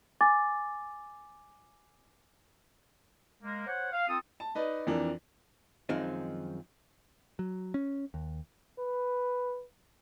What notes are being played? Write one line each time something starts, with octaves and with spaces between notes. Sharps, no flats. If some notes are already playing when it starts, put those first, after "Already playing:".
G#5 D6 A6
G#3 A#3
C5 C#5 F#5
F5
C4 F4 A4 D#6
A5
D#4 B4 D5 D#5
F2 E3 D4 A#4
F#2 D#3 F3 G#3 C4 D#4
F#3
C#4
D#2
B4